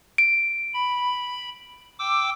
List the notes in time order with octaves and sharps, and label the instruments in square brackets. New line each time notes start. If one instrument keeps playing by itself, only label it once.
[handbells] D7
[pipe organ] B5
G5 D6 E6